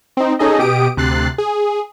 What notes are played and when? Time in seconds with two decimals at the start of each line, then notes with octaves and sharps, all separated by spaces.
0.17 C4 D#4
0.39 C#4 D#4 G#4 A4 D#5
0.58 B2 G4 D#6 D7
0.97 D2 C3 F#6 A6 C7
1.38 G#4